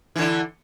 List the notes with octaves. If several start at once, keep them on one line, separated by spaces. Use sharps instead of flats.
D3 E3 E4